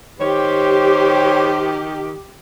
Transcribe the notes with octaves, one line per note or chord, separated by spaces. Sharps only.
D#3 G4 C5 C#5